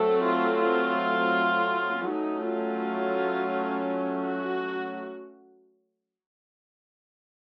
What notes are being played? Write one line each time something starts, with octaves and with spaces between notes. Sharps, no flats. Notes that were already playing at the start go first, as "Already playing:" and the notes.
Already playing: F#3 A3 C4 A4
F4
F4
F#3 A3 C#4 D#4
F4
F#4